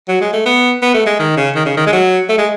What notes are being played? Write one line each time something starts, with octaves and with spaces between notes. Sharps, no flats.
F#3
G#3
A3
B3
B3
A3
G#3
D#3
C#3
D#3
C#3
D#3
G#3
F#3
A3
G#3